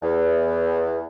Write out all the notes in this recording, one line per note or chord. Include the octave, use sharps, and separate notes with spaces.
E2